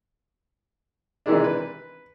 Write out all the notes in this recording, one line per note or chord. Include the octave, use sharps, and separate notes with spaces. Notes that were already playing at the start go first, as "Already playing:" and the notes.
C3 D#3 E3 G#3 D4
B4